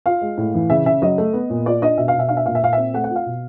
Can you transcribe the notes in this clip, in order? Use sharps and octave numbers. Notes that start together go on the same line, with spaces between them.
F4 F5
G#3
A2
E3
C#3 E5
C#3 E5
F#3 D#5
A3
B3
A#2
F4 D5
D4 D#5
B2 E5
F5
B2
E5
D4 F5
E5
A#2 F5
E5
A#2 F5
E5
C4
A3 F#5
F#5
F4
F5
B2